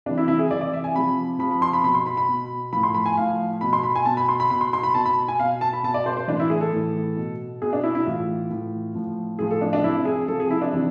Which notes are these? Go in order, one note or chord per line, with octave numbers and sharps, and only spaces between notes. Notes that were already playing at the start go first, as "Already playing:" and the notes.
C3 E3 D4
E4
E4
G#4
C3 E3 D5
D5
E5
G#5
C3 F3 B5
C3 F3 B5
B5
C6
B5
B2 B5
C6
B5
B5
B2
A2 F3 B5
C6
B5
G#5
A2 F3 F5
B2 B5
C6
B5
G#5
B2 A5
B5
C6
B5
B2 B5
C6
C6
B5
B2 A5
B5
G#5
B2 F5
A5
B5
B2 A5
D5
C5
C5
A2 E3 D4
E4
G#4
A4
A2 E3
B2
B2 G#4
D4
E4
E4
A2 E3 F4
A2 E3
A2 F3
A2 F3 G#4
A4
D4
D4
C3 F3 E4
G#4
C3 F3 A4
G#4
E4
D4
C3 E3